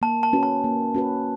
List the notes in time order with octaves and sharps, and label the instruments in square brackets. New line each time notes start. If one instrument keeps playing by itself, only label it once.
[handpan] A#3 [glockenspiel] A5
[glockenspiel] A5
[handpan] C#4 F#4 B4
[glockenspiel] A5
[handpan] A#3
C#4 F#4 B4